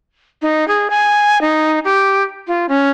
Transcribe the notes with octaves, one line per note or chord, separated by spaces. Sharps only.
D#4
G#4
G#5
D#4
G4
F4
C#4